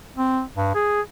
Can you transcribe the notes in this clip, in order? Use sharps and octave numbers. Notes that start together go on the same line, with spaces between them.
C4
G2
G#4